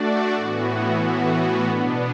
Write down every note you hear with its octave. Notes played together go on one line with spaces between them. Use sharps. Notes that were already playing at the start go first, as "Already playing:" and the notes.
Already playing: A3 D4 F#4 D5
A2 E3 B3 F#4
A2 E3 B3 F#4
B2 B3 D4